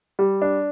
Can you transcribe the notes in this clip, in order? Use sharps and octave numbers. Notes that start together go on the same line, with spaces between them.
G3
D4